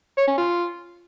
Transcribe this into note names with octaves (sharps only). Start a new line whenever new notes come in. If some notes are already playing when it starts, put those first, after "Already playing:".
C#5
C#4
F4